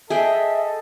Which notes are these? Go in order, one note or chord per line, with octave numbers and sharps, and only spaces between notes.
G#4 A4 D#5 E5 G5